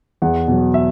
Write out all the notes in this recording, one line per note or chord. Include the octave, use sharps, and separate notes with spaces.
E2 F#5
B2 F#3
E5